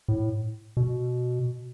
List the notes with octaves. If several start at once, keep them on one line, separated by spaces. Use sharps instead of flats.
A2
B2